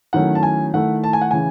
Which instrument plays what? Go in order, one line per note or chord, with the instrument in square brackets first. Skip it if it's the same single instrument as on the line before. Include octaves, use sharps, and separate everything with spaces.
[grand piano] D#3 F#3 A3 C#4 E4 F#5
A5
G#5
D#3 A3 E4 F#5
A5
G#5
F#5
C#3 E3 G#5